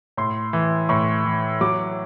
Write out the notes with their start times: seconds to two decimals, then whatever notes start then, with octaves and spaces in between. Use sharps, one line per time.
0.17 A2 C6
0.53 E3
0.89 A2 C#6
1.25 E3
1.61 F#3 D6